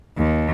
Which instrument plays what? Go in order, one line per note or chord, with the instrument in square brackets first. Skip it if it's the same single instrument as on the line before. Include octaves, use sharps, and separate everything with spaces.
[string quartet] D#2